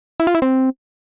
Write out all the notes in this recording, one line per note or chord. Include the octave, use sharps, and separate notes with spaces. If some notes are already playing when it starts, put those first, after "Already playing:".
E4
F4
E4
C4